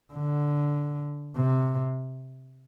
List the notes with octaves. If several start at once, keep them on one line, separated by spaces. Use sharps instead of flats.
D3
C3